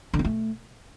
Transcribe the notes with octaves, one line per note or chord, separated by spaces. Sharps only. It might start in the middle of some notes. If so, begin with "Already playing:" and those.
D3
C4
A3